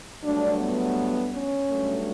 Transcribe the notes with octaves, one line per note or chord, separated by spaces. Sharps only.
G2 F#3 A3 D4
B3
C#4
G2 F#3 A3